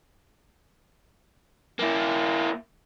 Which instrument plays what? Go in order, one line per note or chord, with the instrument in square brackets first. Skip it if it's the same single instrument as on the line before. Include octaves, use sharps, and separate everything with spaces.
[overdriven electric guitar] A#3 E4